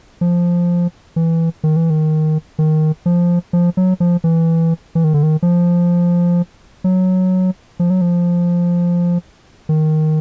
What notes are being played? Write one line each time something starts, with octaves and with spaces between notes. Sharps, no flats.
F3
E3
D#3
E3
D#3
D#3
F3
F3
F#3
F3
E3
E3
D#3
D3
D#3
F3
F#3
F3
F#3
F3
D#3